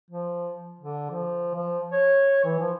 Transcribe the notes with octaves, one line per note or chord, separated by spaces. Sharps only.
F3
D3
F3
F3
C#5
E3
F3